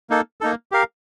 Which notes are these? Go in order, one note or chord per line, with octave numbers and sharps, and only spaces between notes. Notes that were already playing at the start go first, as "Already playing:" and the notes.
A#3 D#4 A4
A#3 D#4 A4
G4 A#4 F5